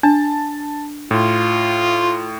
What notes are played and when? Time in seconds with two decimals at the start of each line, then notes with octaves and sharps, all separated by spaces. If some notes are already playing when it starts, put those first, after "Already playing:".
0.03 D4 A5
1.11 A2 F4